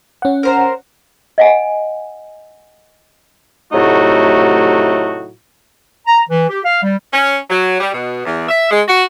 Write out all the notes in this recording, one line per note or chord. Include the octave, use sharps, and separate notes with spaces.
C#4 F#5
A#4 C5 A#5
D#5 F#5 G#5
A2 C3 F#3 A3 D#4 F#4
A#5
E3
G4
F5
G3
C#4
F#3
G3
B2
E2
E5
G#3
F#4